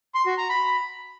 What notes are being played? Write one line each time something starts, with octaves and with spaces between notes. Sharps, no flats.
C6
F#4
A#5
B5